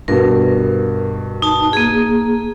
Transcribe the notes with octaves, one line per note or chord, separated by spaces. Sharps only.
G2 B2 A#4
D#4 A5
A#3 G#4